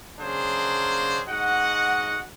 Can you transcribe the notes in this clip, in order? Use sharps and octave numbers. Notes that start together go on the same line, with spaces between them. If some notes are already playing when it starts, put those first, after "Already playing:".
C#3 F#3 A#3 D4 G#4 C5
G#2 F#4 D#5 F#5